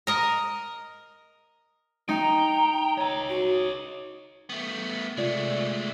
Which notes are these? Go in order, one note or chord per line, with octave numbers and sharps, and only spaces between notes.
A#4 D#5
D#4 G5 A#5
C#5 D#5
F#4
A3 B3
C3 G#3 A3 F4 D5